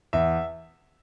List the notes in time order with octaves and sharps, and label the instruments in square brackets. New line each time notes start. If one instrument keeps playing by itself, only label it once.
[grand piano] E2 E5